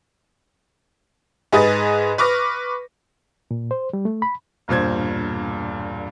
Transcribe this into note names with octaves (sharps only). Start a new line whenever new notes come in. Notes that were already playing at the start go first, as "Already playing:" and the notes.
G#2 G#4 B4 D#5 A6
B4 C#6 D6 F6 A#6
A#2
C5
G3
A3
B5
E1 G2 A#2 C5 G#6